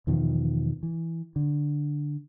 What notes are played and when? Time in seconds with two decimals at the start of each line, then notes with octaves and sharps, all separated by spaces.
0.07 E2 B2 D#3 F3
0.83 E3
1.36 D3